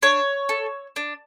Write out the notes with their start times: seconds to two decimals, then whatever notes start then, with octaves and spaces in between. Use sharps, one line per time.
0.02 D4 C#5
0.49 A4
0.96 D4